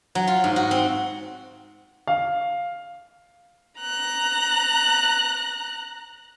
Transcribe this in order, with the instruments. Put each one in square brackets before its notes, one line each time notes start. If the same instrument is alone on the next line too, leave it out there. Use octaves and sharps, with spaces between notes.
[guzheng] F#3
F4
G#2
F#4
C4
[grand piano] F5
[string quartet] A#5 F#6